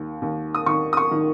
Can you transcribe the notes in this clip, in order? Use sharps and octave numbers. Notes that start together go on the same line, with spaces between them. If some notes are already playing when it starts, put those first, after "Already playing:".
Already playing: D#2
D#2
D#6
D#3 C#6
D#6
C#6
D#3